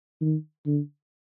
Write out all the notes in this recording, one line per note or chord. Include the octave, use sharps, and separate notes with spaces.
D#3
D3